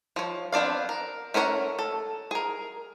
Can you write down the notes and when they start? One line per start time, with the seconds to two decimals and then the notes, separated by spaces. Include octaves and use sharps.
0.16 F3 C#5
0.53 B3 C4 D4 D5 F5
0.89 A#4
1.34 A3 C#4 A#4 C#5 F#5
1.79 A4
2.31 G#4 A#4